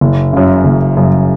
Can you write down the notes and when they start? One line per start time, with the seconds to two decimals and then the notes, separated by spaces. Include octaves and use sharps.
0.01 F#1
0.33 F#2 C#3
0.65 F#1
0.97 F#2 C#3